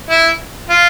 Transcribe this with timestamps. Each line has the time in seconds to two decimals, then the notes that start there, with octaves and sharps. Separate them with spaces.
0.10 E4
0.70 F4